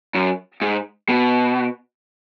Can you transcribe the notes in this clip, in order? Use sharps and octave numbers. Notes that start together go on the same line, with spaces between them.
F#2
G#2
B2